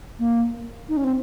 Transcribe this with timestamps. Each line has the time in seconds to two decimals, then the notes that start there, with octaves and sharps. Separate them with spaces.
0.19 A#3
0.89 D#4
0.97 C#4
1.04 C4